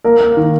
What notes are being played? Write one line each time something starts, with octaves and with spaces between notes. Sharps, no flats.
A#3 A#4
A#3
D#3